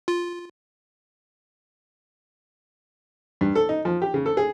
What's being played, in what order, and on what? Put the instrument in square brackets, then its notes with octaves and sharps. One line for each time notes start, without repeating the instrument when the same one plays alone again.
[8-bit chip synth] F4
[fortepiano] G2
A4
D#4
F3
G4
C#3
A4
G#4